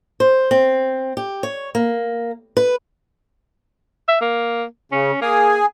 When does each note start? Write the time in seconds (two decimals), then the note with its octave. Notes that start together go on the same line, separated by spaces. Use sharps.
0.20 C5
0.51 C4
1.17 G4
1.43 C#5
1.75 A#3
2.57 B4
4.08 E5
4.21 A#3
4.92 C#3 C#4
5.22 A#3 G#4 G#5